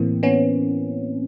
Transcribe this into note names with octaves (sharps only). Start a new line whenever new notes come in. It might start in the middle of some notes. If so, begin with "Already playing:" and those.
Already playing: A2 E3 A#3 C4
B3 C#4